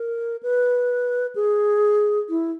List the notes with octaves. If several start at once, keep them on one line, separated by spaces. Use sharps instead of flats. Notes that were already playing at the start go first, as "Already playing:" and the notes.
Already playing: A#4
B4
G#4
E4